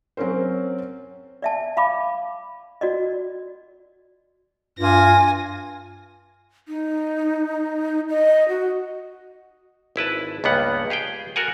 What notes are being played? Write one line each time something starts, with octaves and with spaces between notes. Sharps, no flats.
F#3 C4 C#4 A#4 C5
D5 E5 A5
F5 B5 D6
F#4 D5 D#5
G2 F4 G#5 A#6
D#4
D#5
F#4
G#1 E4 B4 A5
C#2 G2 A#3 B3 F#5
G4 G#4 F5 G5
F#4 A4 A#4 F#5 G#5